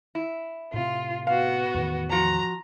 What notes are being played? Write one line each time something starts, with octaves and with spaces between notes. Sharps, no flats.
E4
A2 C3 F4
B3 F#4 F5
E2 A2 D#3
F3 F#4 A#5